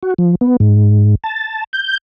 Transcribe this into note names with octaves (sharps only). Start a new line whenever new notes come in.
F#4
F3
B3
G#2
A5
G6